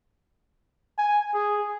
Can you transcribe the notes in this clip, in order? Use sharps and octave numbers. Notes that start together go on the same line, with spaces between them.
G#5
G#4